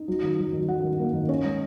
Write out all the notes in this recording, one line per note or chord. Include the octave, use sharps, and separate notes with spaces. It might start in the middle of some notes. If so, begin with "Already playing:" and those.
Already playing: D#4
F#3
D#3
F#3
D#3
F#3 F#5
D#3
A#3
D#3
C#4 C#5
G#3